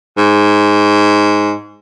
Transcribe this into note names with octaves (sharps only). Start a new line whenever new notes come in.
G#2